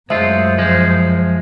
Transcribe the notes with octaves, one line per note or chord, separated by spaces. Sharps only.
F#2 G#3 A3 F4 C5 E5
F3 G#3